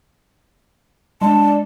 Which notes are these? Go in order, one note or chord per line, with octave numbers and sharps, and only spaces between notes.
G#3 D4 A5